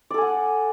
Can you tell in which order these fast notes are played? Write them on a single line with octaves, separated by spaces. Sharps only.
D5 A4 G#5 F#5